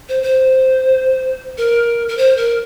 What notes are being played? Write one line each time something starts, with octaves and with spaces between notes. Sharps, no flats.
C5
C5
A#4
A#4
C5
A#4